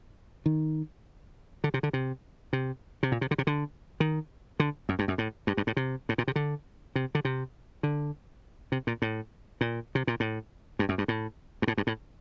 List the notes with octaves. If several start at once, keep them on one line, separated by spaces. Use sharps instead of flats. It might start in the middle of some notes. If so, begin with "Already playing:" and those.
D#3
D3
C3
D3
C3
C3
C3
A#2
C3
D3
C3
D3
D#3
D3
F#2
G2
F#2
A2
G2
G2
A2
C3
A2
A#2
C3
D3
C3
D3
C3
D3
C3
A#2
A2
A#2
C3
A#2
A2
G2
F#2
G2
A2
G2
A2
G2
A2